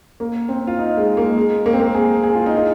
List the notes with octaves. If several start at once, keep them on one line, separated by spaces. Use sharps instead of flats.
A#3
C4
F4
D#4
G#3
A#3
G#3
A#3
C4
A#3
G#4
G#4
F4
D#4
F4